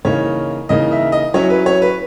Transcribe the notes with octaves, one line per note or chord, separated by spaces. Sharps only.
C#3 E3 A#3 D#4 C#5
C#3 E3 A#3 D#4 D#5
E5
D#5
F#3 C#4 E4 C#5
B4
C#5
B4